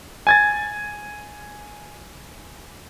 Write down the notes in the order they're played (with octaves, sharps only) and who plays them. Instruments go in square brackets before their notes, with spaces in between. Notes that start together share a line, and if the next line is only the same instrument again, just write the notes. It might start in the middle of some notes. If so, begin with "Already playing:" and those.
[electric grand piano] G#5 G#6 A6